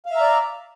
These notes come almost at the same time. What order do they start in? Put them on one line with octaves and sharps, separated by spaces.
F5 E5 A#5 D5